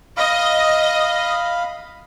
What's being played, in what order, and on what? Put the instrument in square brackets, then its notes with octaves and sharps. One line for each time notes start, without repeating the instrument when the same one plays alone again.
[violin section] D#5 [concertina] F5 B5